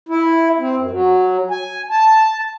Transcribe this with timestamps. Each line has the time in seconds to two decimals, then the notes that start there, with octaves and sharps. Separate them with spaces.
0.09 E4
0.60 C4
0.78 F#2
0.91 F#3
1.51 G#5
1.91 A5